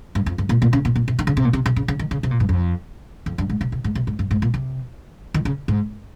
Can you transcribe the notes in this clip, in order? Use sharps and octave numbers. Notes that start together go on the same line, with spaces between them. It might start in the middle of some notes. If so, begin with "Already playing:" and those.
G2
F2
G2
A#2
A#2
C#3
A#2
A#2
C3
D#3
C#3
C3
A#2
C3
C3
C#3
C#3
D#3
C#3
C3
A#2
G2
F2
F2
G2
G#2
C3
C3
G#2
C3
G#2
G2
G#2
A#2
C3
D#3
C#3
G#2